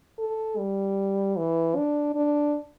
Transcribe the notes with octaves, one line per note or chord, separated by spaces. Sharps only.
A4
G3
E3
D4
D4